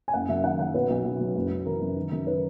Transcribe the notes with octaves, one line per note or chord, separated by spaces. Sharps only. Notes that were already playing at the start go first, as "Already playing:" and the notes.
G#5
F#1 F#5
F#2 E5
D#3 F#5
F#2 F#5
B1 B4
B1
B1
F#3
F#1
F#1
E3 A#4
F#2
D#3
F#2
D#3 B4